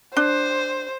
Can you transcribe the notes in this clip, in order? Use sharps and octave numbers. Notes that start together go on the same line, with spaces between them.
D4 C5